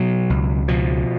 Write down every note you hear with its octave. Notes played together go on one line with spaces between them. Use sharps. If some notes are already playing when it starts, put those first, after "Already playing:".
Already playing: B2 F#3
C#2
B2 F3